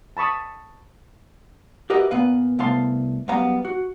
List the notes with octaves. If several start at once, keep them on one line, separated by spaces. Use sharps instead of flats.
A5 B5 C#6 D#6
F#4 G4 A#4 B4 D#5 E5
A#2 B3 B4 F5
C2 A3 B3 F5 A5 C6
F#2 G3 B3 F5 A#5
F#4